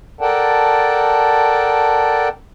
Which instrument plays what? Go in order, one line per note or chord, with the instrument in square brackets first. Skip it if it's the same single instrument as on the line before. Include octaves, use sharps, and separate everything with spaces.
[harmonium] A4 A#4 D5 F#5 G5 A5